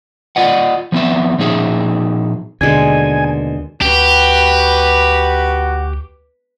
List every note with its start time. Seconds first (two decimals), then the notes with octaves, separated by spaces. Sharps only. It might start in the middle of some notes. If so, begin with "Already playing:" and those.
0.36 F4 D5 D#5 F#5
0.92 F3 B3 C4 E5
1.39 A#2 F3 D#4 G#4 E5
2.61 D#2 B2 D3 G#3 G#5
3.82 D2 F#4 G4 B4 B5